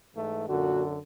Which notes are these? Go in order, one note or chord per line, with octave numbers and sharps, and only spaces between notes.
G#2 E3 A3
F#2 A#2 D3 F#4